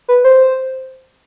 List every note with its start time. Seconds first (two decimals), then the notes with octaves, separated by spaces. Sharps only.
0.08 B4
0.24 C5